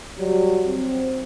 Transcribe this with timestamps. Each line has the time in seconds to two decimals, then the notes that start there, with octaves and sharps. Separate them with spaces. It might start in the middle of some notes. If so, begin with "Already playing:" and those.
0.18 F#3 G3
0.67 C4